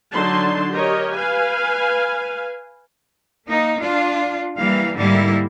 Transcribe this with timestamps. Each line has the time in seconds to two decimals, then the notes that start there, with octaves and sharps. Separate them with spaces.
0.12 D3 F#3 D#4 A5 C6
0.72 G4 A#4 C#5 D#5
1.14 B4 F5 G#5
3.48 A#3 D#4
3.81 D4 F4
4.58 E3 G3 A#3 F5
4.97 G#2 D3 G3 A#3 E4